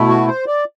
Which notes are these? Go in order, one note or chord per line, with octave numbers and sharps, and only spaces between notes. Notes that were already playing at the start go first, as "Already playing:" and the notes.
Already playing: B2 A3 E4
F#4
C5
D5